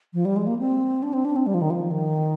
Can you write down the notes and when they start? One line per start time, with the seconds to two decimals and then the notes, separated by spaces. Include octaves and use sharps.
0.14 F3
0.25 G3
0.36 G#3
0.47 A#3
0.59 C4
1.03 D4
1.13 C4
1.25 D4
1.36 C4
1.47 G3
1.54 F3
1.62 D#3
1.70 F3
1.91 D#3